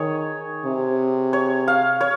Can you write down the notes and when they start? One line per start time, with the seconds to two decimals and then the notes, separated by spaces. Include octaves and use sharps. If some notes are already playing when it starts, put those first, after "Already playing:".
Already playing: D#3 G#4 C#5
0.66 C3
1.33 C#5
1.68 F5
2.01 C#5